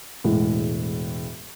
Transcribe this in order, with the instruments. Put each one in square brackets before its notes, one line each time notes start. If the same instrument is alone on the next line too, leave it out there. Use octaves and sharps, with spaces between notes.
[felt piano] E1 A2 G#3